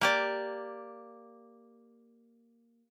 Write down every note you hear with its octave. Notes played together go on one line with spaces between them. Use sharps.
A#3 G4 D5